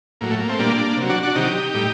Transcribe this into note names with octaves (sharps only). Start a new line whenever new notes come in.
A2 F#3 A#3
A3
A#3
A3 C4
A#2 G3 A#3 D4
C3 F#3
D4 F#4
D4 F#4
C3 D#3 F#3 D#4 G4
A2 G3